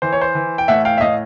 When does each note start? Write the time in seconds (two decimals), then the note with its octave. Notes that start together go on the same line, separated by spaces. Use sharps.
0.02 E3 C5
0.12 C#5
0.21 C5
0.35 E3
0.58 G5
0.68 A2 E5 F#5
0.85 F5 G5
0.98 E5
1.01 A2 D#5 F5